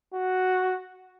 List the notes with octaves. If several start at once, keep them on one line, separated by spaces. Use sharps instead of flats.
F#4